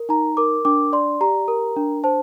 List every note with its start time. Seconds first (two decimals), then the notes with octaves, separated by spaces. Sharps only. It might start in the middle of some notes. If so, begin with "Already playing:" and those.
Already playing: A#4
0.09 D#4 A#5
0.37 A#4 D6
0.65 D4 D6
0.93 D5 C6
1.21 G4 A#5
1.48 A#4
1.76 D4
2.04 C5 A5